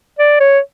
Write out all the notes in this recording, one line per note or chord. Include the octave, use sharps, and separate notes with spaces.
D5
C#5